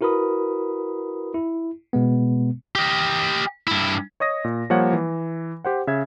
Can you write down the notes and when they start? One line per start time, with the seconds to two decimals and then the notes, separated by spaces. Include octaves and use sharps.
0.01 E4 F#4 A#4 B4 B5 D#6
1.35 E4
1.93 B2 G#3 B3
2.75 G4 D#5
3.68 G2 E4
4.20 C#5 D#5 D#6 A#6
4.44 A#2
4.70 F3 G3 A#3 C#5 F#5
4.93 E3
5.65 G4 C5 F#5
5.87 C#3 E5 G#6